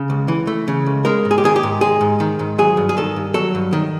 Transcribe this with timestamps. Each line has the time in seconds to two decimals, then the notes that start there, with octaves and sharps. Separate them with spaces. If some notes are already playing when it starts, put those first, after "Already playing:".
Already playing: C#3
0.10 C#2
0.28 E3
0.47 A3
0.68 C#3
0.86 C#2
1.05 G#3 A#4
1.25 G#2
1.31 G#4
1.38 G4
1.44 D#3 G#4
1.56 G4
1.63 G#2
1.81 G#3 G#4
2.01 G#2
2.20 D#3
2.39 G#2
2.58 F#3 G#4
2.77 G2
2.89 G#4
2.97 D#3 A4
3.16 G2
3.34 F#3 A4
3.55 G2
3.73 D#3